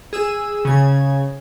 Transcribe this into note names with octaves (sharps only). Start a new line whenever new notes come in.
G#4 E6 D#7
C#3 G#6